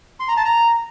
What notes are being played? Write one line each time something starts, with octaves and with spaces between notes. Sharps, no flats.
C6
A#5
A5
A#5